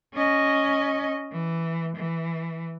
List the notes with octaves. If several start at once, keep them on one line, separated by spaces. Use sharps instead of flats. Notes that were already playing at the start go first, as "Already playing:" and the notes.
C#4 D#5
E3
E3